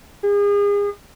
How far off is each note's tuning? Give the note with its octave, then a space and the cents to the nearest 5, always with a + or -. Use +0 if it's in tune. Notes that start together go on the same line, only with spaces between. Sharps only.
G#4 -35